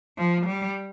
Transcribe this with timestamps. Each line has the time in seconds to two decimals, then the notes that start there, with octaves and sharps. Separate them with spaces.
0.18 F3
0.46 G3